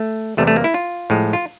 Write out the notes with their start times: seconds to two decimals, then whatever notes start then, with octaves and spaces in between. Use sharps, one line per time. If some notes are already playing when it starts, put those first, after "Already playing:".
Already playing: A3
0.37 E2 C3 E3 G3 A3
0.47 A3
0.56 A#3
0.64 E4
0.74 F4
1.10 A2 F3 G#3
1.33 F4